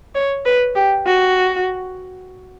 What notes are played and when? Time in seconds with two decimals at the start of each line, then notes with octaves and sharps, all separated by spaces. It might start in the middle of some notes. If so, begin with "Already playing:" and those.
0.15 C#5
0.45 B4
0.75 G4
1.06 F#4